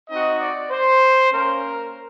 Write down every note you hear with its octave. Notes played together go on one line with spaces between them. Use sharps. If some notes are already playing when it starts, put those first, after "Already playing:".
C4 D#4 F#4 D#5
D5
C5
A#3 C#4 A#4